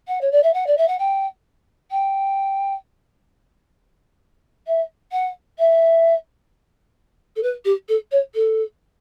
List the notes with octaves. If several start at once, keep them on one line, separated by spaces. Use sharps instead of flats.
F#5
C#5
D5
E5
F#5
D5
E5
F#5
G5
G5
E5
F#5
E5
A4
B4
G4
A4
C#5
A4